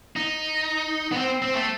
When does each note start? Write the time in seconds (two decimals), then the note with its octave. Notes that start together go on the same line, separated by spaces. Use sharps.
0.16 D#4
1.12 B3
1.17 C4
1.42 C4
1.55 A3